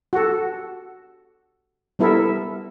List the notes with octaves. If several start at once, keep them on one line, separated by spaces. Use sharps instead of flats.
F#4 G4 A4
G3 B3 E4 A4 A#4 E5